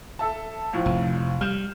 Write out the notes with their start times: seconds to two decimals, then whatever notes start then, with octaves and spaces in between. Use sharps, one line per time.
0.19 A4 E5 A5
0.73 C#2 A2 F3
0.86 F1
1.41 G3 F6 G6 E7